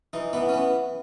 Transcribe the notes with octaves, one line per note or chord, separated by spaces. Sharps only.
E3 D#4
E3 B3
C#4
B3